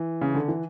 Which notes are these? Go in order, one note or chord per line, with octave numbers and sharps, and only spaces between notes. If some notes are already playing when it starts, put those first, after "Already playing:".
Already playing: E3
C#3
D3
E3